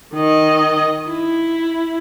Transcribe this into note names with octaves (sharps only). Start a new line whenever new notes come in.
D#3 D#5
E4